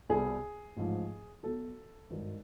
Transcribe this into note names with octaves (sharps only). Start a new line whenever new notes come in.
C2 B2 G3 G#4
A1 G#2 F3
B1 B2 F#3 A4
G#1 G2 D#3 F#3